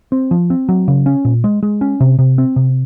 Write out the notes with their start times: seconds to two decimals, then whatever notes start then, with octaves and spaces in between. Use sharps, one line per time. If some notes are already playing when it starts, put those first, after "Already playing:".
0.12 C4
0.31 F3
0.50 C4
0.69 F#3
0.88 C#3
1.06 C#4
1.25 A#2
1.44 G#3
1.63 G#3
1.81 C#4
2.00 C3
2.19 C3
2.38 C4
2.56 C3